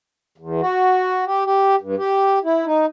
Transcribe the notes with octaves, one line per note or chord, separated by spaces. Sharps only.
E2
F#4
G4
G4
G2
G4
E4
D#4